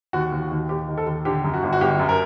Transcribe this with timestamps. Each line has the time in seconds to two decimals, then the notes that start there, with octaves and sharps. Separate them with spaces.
0.13 D#2 F#4
0.32 D#2
0.42 F#4
0.51 D#2
0.69 D#2 G4
0.88 D#3
0.97 A4
1.07 D#2
1.25 D3 G4
1.44 F#2
1.54 F#4
1.63 G1
1.73 F#4
1.81 G1 G4
1.99 F#2
2.09 A#4